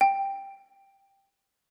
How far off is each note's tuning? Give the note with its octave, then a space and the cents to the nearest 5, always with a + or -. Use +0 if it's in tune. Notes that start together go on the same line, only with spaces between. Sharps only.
G5 +5